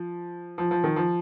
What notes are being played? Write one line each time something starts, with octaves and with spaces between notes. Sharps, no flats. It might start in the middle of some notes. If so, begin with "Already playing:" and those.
Already playing: F3
F3
F3
D#3
F3